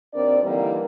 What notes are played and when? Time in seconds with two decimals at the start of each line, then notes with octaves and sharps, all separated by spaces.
0.14 D#2 C4 D4 A#4 D5
0.43 D3 E3 G3 A#3 D#4 A#4